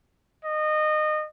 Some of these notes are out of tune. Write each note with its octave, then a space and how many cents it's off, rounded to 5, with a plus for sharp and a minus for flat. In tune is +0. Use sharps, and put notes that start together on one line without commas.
D#5 -25